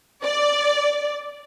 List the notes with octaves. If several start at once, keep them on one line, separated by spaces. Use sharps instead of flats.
D5